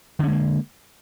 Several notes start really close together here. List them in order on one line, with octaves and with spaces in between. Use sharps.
D3 C#4 G#3 A#3